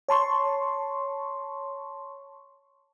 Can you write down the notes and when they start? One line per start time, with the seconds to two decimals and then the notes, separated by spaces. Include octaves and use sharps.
0.08 C#5 A5 C6 C#6